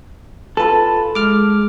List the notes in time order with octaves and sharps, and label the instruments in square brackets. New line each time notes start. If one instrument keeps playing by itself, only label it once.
[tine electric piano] F4 A5 [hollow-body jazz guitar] A4 [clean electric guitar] B4
[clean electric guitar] G#3 [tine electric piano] D6 F6